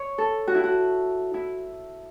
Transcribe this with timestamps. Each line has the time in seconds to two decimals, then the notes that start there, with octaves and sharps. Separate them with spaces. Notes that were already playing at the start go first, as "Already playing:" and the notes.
Already playing: C#5
0.18 A4
0.47 F#4
0.55 E4
0.63 F#4
1.34 E4